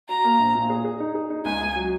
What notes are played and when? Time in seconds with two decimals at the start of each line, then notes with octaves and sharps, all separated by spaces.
0.09 F#4 A#5
0.24 A#3
0.39 A#1
0.55 A#2
0.70 G#4
0.85 G#4
1.00 D#4
1.15 G#4
1.30 D#4
1.45 C#2 G#5
1.61 C#2
1.76 F#3